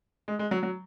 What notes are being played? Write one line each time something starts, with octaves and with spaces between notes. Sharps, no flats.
G#3
G#3
F#3
F#3